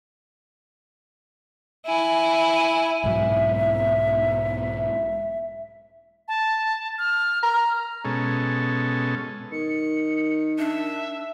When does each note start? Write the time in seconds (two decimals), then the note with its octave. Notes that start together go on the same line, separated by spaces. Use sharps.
1.86 E4 G#5
3.04 B1 G#2 F#3 E5
6.28 A5
6.98 F6
7.43 A#5 F6
8.05 B2 G#3 C#4 A4
9.52 D#3 C#7
10.59 D4 E5